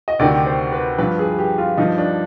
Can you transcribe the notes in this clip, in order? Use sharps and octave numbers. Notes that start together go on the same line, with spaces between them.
D#5
D2 C3 D#3 D5
C5
B4
G2 F3 B4
G#4
G4
F4
G2 F3 D#4
D4